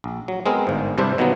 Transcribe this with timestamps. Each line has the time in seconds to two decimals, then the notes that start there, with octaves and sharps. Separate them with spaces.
0.04 A#1
0.28 F#3
0.46 G#3 B3 C4 G#4 A#4
0.67 G1 G#2
0.98 G2 C3 G3 D4 E4 C5
1.18 B2 D#3 F#3 A#3 B3